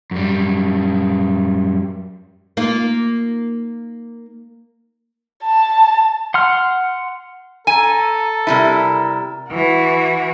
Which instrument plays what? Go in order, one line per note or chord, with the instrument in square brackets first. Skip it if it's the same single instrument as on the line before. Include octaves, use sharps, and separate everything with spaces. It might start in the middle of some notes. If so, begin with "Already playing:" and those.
[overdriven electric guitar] F#2 G3
[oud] A#3 D#4 F4
[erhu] A5
[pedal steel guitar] F#5 C6 F6
[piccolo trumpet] A4 [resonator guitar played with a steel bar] G#5 [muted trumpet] A#5
[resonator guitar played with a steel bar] C3 G3 E4 [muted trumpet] A#4
[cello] E3 F#4